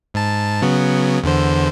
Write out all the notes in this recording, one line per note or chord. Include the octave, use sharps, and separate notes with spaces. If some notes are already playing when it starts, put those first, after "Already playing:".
G#2 A5
C#3 F#3 B3
E2 D3 C5